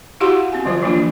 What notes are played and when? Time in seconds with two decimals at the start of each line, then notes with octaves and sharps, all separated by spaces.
0.20 E4 F#4 G4 F5 F#5 C6
0.52 C4 G#5
0.65 D3 F3 F#3 C4 F4 C5
0.83 E3 F3 A#3 D4 F4